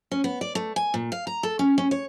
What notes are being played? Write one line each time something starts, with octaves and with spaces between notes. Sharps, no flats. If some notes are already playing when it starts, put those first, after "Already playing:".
C#4
B3
D5
A3
G#5
A#2
F5
A#5
A4
C#4
C#4
C#5